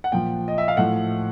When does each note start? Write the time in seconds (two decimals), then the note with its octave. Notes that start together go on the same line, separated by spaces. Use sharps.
0.04 F#5
0.12 A#2 F3 G5
0.48 D#5
0.58 E5
0.68 F5
0.77 A2 F3 F#5